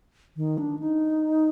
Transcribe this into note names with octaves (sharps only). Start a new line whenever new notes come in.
D#3
D4
D#4